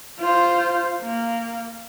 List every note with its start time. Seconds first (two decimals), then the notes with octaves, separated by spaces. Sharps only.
0.19 F4 C5
1.02 A#3